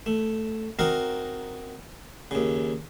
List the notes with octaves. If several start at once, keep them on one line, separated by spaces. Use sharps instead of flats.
A3
C4 D#4 F#4 A#4 F5
D#2 C#3